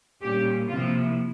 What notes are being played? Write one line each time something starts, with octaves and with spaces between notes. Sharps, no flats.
A#2 G3 A#3 C#4 G4
C3 F3 A#3 E4 F4